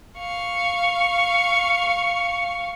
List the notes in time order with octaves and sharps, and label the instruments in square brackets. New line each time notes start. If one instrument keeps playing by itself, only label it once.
[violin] F5 C#6